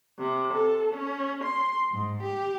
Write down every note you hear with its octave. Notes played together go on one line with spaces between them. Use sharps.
C3
A4
C#4
C6
G#2
G4